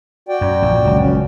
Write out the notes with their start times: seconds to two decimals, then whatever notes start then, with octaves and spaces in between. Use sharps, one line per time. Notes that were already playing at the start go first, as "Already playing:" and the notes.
0.29 F#4 D5 G5
0.41 F#2
0.62 A#1
0.84 F#1 C#2
0.99 C#4